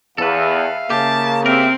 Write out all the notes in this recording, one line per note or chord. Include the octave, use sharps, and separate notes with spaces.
E2 A4 B4 E5 F5
C#3 A#3 G4 A5
C4 G4 A#4 E5